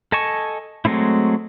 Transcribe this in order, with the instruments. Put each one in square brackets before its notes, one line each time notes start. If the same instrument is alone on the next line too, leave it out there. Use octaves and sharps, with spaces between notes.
[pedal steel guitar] A4 D#5 G#5 A5 C#6
F#3 G#3 A3 C4 E4